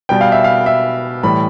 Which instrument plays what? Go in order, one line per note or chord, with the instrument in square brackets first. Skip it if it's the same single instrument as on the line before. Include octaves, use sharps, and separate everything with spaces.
[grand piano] B2 G3 G5
F5
E5
F5
E5
A2 E3 G3 B5